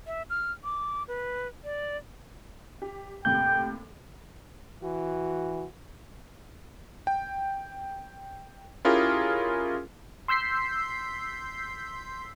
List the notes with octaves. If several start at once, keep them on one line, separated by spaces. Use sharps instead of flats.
E5
F6
D6
B4
D5
G4
D#2 A2 C3 G5 G6
E3 F#4
G5
C#4 E4 F4 G4 G#4 A#4
C6 E6 G6 B6 C7